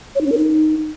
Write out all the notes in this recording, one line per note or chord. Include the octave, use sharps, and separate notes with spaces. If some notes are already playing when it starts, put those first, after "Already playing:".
C#5
D#4
C#4
A#4
D#4